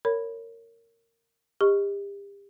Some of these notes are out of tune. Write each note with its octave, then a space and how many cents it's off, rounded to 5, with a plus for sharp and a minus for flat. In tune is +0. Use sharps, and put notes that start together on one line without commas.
A#4 -20 C#5 +10 B5 +0
G4 +35 D#5 +0 C#6 +0